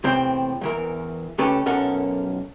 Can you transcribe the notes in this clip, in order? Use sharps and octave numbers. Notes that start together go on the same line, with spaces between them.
E2 A2 C3 C4 C5 G5
E2 E3 A#4
C#2 A3 C#4 G4 A4 B4
B1 F#2 C#4 A4 A#4 F#5